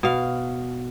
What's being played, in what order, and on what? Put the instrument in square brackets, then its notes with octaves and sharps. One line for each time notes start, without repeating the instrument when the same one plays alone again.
[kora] B2 F5